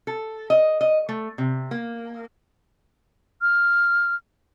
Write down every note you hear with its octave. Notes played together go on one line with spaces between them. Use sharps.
A4
D#5
D#5
A3
C3
A#3
F6